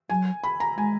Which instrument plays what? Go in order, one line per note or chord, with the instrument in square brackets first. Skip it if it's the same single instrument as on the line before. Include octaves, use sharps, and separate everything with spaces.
[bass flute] F#3 [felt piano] G#5
[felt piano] B5
A#5
[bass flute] G#3 [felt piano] G#5